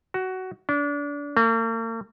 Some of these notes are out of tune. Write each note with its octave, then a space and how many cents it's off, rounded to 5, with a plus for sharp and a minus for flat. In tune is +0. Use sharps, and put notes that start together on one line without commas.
F#4 +15
D4 -30
A#3 -45